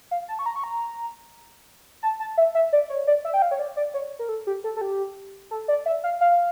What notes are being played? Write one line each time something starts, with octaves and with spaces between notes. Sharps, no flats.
F5
A5
C#6
A#5
C#6
A#5
A5
A5
E5
E5
D5
C#5
D5
E5
G5
F5
C#5
D5
D5
C#5
A#4
A4
G4
A4
A4
G4
A4
D5
E5
F5
F5